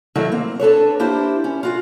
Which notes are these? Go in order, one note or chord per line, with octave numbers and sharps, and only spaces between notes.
D#3 F#3 A3 E4 F#4
A#3 C4
D4 A4 B4 C#5
A#3 D4 E4 G4 C5
C#4
F4 F#4 F#5